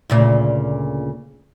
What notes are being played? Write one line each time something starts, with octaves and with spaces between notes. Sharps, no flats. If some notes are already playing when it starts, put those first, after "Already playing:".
D2 A#2 C#3